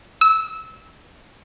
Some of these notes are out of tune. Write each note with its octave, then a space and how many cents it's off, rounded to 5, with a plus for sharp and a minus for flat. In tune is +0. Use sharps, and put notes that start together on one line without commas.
E6 -20